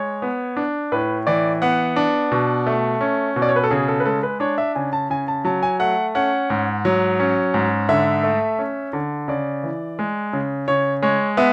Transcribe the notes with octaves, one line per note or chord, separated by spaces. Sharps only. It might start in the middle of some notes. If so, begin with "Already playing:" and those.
Already playing: G#3 C#5
B3
D4
A2 B4
E3 D5
B3 F#5
D4
B2
A3
C#4
B2
D5
C#5
B4
A4
C#3 G#4
A4
B4
G#3 A4
B4
D4 C#5
E5
C#3 G#5
A5
C#3 G#5
A5
F#3 A5
G#5
A3 F#5
C#4 F#5
G#2
F#3
C#4
G#2
D3 E5
A3
C#4
D3
C#3 D5
E3
G#3
C#3
C#3 C#5
G#3 C#5
B3 E5